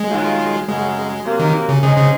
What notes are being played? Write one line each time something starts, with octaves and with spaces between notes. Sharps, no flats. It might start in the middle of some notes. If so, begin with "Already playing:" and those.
Already playing: G#3
D#3 F#3 A#3 F4
F#2 C#3 F#3 G#3
C3 F#3 A#3
D#3
C#3
C#3 G#3 D#4 G#4 C5 D#5
C#3